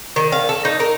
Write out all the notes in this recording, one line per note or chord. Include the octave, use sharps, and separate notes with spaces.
D#3
F5
A4
D#4
A#4